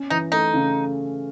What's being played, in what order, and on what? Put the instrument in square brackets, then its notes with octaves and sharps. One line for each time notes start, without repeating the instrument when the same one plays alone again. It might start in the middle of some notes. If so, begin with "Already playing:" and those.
Already playing: [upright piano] C#4
[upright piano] E3 [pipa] D#4
[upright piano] A3 [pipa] D#4
[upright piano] C#3